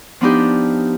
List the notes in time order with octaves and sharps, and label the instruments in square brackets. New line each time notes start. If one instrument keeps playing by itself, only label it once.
[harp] F3 B3 D4 D#4 G4